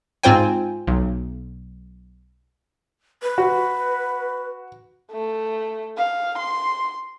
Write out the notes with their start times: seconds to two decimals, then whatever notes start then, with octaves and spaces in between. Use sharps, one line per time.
0.23 G#2 C4 F4 C5 G5 G#5
0.87 B1
3.23 B4
3.38 F#4
5.12 A3
5.97 F5
6.38 C6